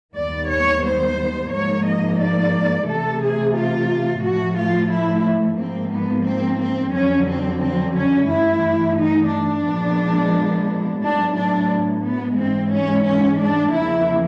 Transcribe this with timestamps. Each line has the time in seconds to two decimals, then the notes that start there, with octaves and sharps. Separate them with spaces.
0.15 D#2 D#3 G3 B3 D5
0.49 C#5
0.84 C5
1.51 G#2 F3 A#3 C#5
1.85 D#5
2.19 D5
2.87 C3 E3 A3 A4
3.21 G#4
3.55 F4
4.23 A2 F3 A3 F#4
4.57 F4
4.91 E4
5.59 G#2 F3 A#3 C4
5.93 B3
6.27 C4
6.60 C4
6.94 F2 D3 F#3 C#4
7.28 C4
7.62 C4
7.96 C#4
8.30 G2 E3 A3 E4
8.98 D#4
9.32 D4
9.65 A#2 F3 G#3 B3
11.01 A2 F#3 B3 D4
11.35 D4
12.03 B3
12.37 G#2 E3 G#3 C4
12.71 C#4
13.05 C#4
13.39 D4
13.73 E2 C#3 F3 A#3 E4